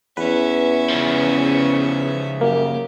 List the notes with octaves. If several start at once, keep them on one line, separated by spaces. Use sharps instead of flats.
E2 C#4 B4 E5
C#3 F3
F#2 A#3 G4